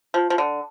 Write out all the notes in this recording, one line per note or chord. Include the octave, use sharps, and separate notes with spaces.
F3
F3
D3